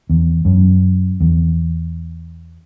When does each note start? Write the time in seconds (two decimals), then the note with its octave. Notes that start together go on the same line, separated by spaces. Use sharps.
0.10 E2
0.45 F#2
1.20 E2